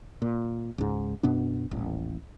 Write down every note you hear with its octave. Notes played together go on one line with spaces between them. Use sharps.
A#2
C#2 G#2
F#2 B2 B3 D4
D#1 A1